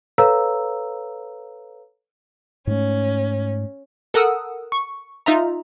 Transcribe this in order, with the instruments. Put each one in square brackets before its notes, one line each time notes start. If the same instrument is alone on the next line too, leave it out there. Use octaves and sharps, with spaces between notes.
[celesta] A4 B4 C#5 F5 A#5 E6
[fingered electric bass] G#2 A3 [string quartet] C#4
[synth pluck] A4 A#4 F#5 D#6 E6
C#6
D#4 F4 E5 A#5